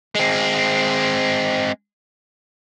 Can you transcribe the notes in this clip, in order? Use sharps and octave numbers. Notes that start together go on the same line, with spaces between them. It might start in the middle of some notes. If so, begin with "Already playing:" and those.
G#3 C4